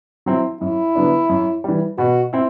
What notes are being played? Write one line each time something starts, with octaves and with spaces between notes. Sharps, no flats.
F#3 C4 E4
F#2 E4
D3 F#3 B3 D4
F#2
E3 G3
B2 F#4
C4 E4